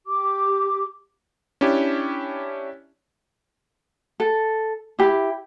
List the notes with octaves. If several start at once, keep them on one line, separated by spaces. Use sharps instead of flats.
G4 D6
C#4 D4 E4 G4
A4
E4 G4 B5